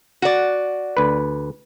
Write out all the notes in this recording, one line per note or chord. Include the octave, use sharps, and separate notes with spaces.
F#4 D5
D2 B4